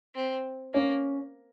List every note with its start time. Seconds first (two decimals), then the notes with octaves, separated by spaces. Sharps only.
0.15 C4
0.73 A#3 C#4